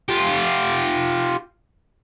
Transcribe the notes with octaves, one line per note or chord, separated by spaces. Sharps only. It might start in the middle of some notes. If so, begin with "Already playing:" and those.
F4 G4